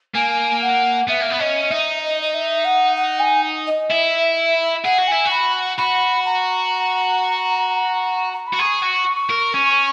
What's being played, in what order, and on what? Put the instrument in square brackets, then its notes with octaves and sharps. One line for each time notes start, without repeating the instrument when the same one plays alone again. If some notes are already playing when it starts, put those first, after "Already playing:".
[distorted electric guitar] A#3 [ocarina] G#5
[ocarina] F#5
[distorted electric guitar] B3 [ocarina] E5
[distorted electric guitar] A#3
B3
[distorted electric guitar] C#4 [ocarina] D#5
[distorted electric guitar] D#4 [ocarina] E5
[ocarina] D#5
D#5
E5
F#5
F#5
G#5
D#5
[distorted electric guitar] E4 [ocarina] E5
[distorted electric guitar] G#4 [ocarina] F#5
[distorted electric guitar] F#4
[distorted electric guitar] E4 [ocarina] G#5
[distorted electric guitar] F#4
[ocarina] B5
[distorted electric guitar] F#4 [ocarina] B5
[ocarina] A#5
A#5
B5
[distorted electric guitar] F#4
[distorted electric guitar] G#4 [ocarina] C#6
[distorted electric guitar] F#4
A#4
C#4